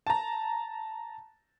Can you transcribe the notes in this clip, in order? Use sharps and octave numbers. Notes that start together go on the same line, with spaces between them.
A5 A#5